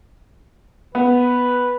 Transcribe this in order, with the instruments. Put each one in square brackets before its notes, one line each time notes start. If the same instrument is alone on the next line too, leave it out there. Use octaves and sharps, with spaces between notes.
[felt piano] B3 [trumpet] B4